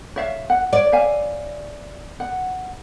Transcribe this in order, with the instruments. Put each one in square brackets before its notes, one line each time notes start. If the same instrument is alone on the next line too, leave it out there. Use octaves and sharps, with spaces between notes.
[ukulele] C#5 E5 F5
F#5
[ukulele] C#5 [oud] D5
[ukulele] E5 F5 G#5
F#5